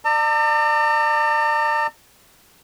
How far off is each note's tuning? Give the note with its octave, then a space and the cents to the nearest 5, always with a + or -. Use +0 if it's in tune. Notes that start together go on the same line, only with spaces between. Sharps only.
D5 +25 A#5 -45 E6 +0